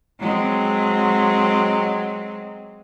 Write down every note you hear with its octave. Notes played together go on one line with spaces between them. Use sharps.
F#3 G#3 C4